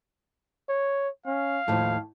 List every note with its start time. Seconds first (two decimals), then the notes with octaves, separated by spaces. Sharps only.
0.69 C#5
1.26 C#4 F5
1.68 D#2 A2 F3